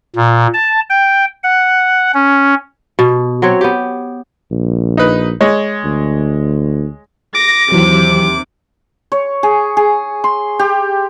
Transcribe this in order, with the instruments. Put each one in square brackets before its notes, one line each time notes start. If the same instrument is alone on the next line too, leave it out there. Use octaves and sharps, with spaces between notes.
[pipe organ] A#2
A5
G5
F#5
C#4
[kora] B2
F#3 C4 C#5
B3 G4
[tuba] A#1
[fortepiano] D#4 B4
G#3 C#5
[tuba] D2
[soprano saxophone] D6 [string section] A#6
[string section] D#2 C3 [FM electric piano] E3 F#3
[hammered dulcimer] C#5
G#4
G#4
C6
G4